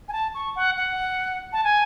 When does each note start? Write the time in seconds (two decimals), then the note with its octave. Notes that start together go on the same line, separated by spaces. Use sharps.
0.08 G#5
0.13 A5
0.35 C#6
0.56 F#5
0.77 F#5
1.53 A5
1.64 G#5